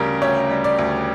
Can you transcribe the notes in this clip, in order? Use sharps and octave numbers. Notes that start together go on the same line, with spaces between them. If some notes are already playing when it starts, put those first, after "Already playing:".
Already playing: D2 C#3 G3 G4 A#4
D2 C#5
G3
D5
D2